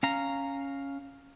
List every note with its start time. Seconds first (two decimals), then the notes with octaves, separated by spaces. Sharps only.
0.03 C#4 F5 A#5